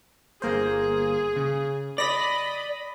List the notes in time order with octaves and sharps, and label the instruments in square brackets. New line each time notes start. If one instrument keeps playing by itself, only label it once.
[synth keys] G1 A#3 C5 [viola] G#4
[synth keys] C#3
[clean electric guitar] D5 [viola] D#5 B5 [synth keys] A#6 B6 D#7